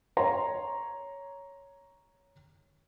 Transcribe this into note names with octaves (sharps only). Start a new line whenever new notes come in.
C#5 A#5 C6